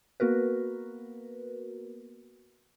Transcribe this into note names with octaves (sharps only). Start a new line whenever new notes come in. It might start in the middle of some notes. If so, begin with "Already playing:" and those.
A#3 B3 F#4 A#4 B4